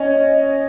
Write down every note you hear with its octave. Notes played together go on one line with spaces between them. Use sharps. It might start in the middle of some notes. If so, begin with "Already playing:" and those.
Already playing: C#4 D#5